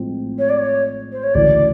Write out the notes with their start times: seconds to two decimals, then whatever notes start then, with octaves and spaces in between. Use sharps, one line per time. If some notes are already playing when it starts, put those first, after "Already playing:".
Already playing: A2 F3 G#3 C4
0.39 C#5
0.49 D5
0.59 C#5
1.12 C5
1.23 C#5
1.35 D2 C#3 E3 D5